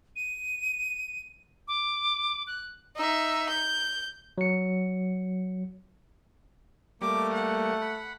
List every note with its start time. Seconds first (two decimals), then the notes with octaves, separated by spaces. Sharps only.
0.16 D#7
1.68 D6
2.47 F#6
2.96 D#4 E5
3.48 G6
4.38 F#3 C#7
7.02 G3 A3 A#3 D6
7.33 F#5
7.82 B5